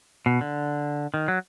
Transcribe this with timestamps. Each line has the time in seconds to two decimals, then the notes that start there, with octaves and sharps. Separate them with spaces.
0.26 B2
0.41 D3
1.14 D#3
1.28 F#3